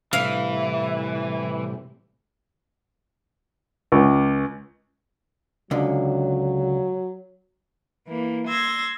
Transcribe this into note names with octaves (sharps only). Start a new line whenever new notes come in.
A2 C3 E3 G3 E5 F5
C#2
C#2 D3 F#3
E3 A#3
C6 E6 G#6 A#6